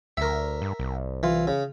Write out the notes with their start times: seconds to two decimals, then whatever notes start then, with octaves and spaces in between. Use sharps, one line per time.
0.17 D2 A#4 E5
0.62 G2
0.79 C2
1.23 E3 F4
1.47 C#3